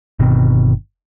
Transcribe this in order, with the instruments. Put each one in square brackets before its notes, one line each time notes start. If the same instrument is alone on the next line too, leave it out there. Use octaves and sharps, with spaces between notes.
[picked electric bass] G1 B2 D#3 C4